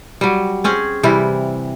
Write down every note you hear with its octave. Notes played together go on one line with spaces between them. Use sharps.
F#3 G3
C4 C#4 G#4
C3 E3 G3 E4